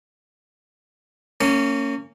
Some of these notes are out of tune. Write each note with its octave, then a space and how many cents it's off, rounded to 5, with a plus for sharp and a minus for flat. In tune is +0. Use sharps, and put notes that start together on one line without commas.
A#3 -30 C#4 +0